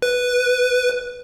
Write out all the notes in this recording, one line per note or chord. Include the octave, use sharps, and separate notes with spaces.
B4